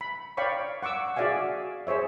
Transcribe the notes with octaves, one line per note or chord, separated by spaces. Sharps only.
B5
C#5 D5 F5 G5 B5 C#6
F#5 C#6 D6 E6
F#4 G#4 D5 E5 F5 G#5
G#4 C5 C#5 E5